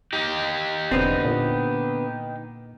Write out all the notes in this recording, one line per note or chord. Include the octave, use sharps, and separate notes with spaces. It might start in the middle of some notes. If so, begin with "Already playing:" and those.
D#4 G4
E1 D3 B3 C4
A#2